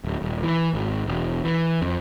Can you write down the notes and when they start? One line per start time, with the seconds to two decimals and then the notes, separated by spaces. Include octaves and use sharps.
0.05 D1
0.22 D#1
0.43 E3
0.74 G#1
1.06 E1
1.44 E3
1.82 F2